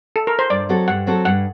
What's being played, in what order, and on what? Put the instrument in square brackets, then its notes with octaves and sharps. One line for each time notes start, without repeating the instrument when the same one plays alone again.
[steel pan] A4
A#4
C5
[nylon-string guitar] G2 [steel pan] D5
[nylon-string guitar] F#3 C4 F#4 A4
[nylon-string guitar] G2 [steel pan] F#5
[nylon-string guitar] F#3 C4 F#4 A4
[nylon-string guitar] G2 [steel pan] F#5